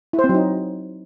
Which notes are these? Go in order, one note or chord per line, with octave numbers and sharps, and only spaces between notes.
E4
C5
C4
F#3
D#4